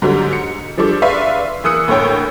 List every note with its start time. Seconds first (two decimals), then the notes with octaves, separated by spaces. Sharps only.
0.02 G#2 D3 F#3 G3
0.33 C#7
0.77 F3 G3 D4 A4 D6
1.02 B4 D5 E5 F5 C6 C#6
1.64 E3 A#3 D#6 E6 F#6 C#7
1.88 D2 A2 A#3 C#5 G5